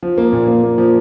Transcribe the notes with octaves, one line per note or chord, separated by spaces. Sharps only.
F3
A#3
A#2
A#3
A#3
F3